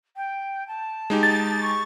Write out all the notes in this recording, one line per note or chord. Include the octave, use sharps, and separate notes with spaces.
G5
A5
G#3 D#4 G4
A6
C#6